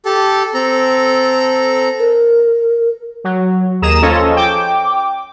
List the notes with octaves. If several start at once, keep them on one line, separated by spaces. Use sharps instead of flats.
G4 A4 A5
C4 A4 A#5
A#4
F#3
D#2 G#4 A#5 D#6 E7
F3 C#4 F4 A4 C#5 D#5
G5 D6